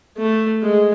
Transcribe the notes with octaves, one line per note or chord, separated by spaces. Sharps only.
A3
G#3